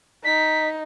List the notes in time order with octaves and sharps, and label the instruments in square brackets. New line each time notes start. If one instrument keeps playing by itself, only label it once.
[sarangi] D#4 [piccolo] B6